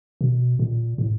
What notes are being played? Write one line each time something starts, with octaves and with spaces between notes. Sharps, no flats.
B2
A#2
A2